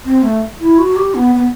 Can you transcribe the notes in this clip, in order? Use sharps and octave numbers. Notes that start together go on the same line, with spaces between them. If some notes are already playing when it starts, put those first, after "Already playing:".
C4
A3
E4
F#4
G4
B3
B3